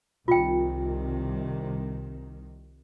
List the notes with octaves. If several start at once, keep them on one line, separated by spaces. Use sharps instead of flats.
C2 C3 D#3 F4 G5